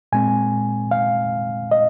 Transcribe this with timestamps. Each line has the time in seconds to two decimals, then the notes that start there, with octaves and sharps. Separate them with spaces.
0.12 A#2 G#3 C4 G#5
0.91 F5
1.71 D#5